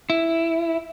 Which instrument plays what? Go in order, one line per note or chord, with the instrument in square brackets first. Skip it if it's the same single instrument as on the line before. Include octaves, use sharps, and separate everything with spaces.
[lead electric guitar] E4